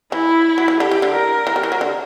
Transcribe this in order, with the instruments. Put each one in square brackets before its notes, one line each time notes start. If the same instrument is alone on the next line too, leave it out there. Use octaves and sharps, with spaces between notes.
[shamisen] E3 [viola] E4
[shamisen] F#3
E3
[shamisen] D3 [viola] G4
[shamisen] E3
D3
[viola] A#4
[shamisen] E3
G3
E3
F#3
D3